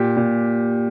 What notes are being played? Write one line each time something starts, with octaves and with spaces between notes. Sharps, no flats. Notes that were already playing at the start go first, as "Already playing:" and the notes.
Already playing: A#2 G4
A#2